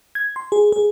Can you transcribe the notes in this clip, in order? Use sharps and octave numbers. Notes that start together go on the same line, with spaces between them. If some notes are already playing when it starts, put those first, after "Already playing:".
G#6
C6
G#4
G#4